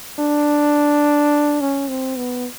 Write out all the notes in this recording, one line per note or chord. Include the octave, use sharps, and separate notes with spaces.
D4
C#4
C4
B3